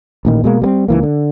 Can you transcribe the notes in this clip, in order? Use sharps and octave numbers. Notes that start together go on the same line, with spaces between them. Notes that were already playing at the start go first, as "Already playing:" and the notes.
A1 A#2 D#3
B2 G#3 A#3
G3 A#3 C4
C#2 E3 A#3
D3